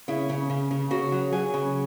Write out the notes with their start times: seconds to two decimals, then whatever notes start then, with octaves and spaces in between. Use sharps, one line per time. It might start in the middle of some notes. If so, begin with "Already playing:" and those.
0.08 C#3 E4
0.30 C#3
0.50 C#3
0.71 C#3
0.91 C#3 F#4
1.12 F#3
1.32 F#3 G#4
1.54 C#3